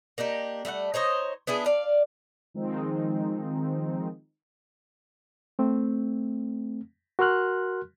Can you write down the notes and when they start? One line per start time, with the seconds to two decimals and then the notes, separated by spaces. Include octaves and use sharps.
0.18 A#3 D4 D#4 G4
0.65 G3 A3 D5 F#5
0.94 D#4 C5 C#5 D#5
1.47 B3 D4 E4 G#4
1.66 D5 F5
2.54 D#3 F3 G#3 C4 D#4
5.59 A3 C4
7.19 F#4 A#4 C6 F6 F#6